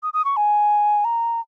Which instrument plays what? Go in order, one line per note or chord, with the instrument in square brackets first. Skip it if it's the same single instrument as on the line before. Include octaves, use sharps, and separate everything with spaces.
[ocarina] D#6
D#6
C#6
G#5
A#5